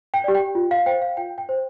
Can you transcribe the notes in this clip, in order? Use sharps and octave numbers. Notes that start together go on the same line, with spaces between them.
G5
G4 D5
G5
F4
F5
C5 G5
F5
F4 G5
G5
C5